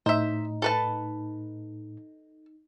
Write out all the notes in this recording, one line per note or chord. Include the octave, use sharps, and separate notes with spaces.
A2 D#4 C5 E5
A4 B4 A5